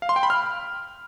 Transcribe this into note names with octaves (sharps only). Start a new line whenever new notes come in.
F5
C6
G5
B5
F6